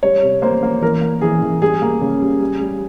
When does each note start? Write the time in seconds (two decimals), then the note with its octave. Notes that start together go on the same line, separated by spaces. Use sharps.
0.03 G3 C#5
0.22 C3
0.42 A#3 C5
0.63 A#3
0.82 E3 A#4
1.01 A#3
1.21 E3 G#4
1.41 E3
1.61 G3 G#4
1.82 A#3
2.01 C#3
2.21 G3
2.40 G3
2.60 G3